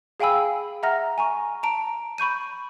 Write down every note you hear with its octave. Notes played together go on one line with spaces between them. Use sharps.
G#4 F5 G5 G#5 B5 E6
E5 F#5 A#5 F6 A#6
G#5 A#5 C#6
A5 A#5 D7
B5 C#6 G6 D#7